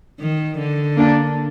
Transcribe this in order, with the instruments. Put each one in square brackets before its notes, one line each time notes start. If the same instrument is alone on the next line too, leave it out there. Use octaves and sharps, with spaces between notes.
[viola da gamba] D#3
D3
[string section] A#3 D4